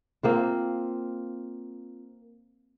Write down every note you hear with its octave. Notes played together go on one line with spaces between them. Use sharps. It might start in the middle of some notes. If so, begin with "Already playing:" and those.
A#3 C4 F4